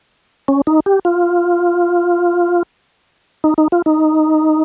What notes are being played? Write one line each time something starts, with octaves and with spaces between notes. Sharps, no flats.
C#4
D#4
G4
F4
D#4
D#4
F4
D#4